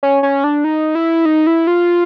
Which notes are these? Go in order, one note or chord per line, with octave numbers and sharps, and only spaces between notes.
C#4
C#4
D4
D#4
E4
D#4
E4
F4